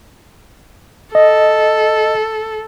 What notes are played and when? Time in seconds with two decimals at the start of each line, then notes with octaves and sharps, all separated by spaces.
1.15 A4 D#5